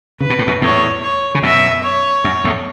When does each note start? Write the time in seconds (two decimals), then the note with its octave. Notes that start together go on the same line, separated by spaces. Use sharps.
0.21 C#3 B4
0.30 B2
0.39 A2
0.47 F#2 B2
0.62 E2 A2 C#5
1.03 C#5
1.35 C#3
1.43 F#2 B2 E5
1.83 C#5
2.24 F#2
2.44 E2 A2